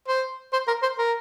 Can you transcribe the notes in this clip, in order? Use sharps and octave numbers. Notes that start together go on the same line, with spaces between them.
C5
C5
A#4
C5
A#4